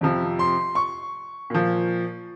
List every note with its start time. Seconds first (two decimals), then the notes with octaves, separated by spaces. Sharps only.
0.01 F2 C3 F3
0.39 C6
0.75 C#6
1.50 A#2 F3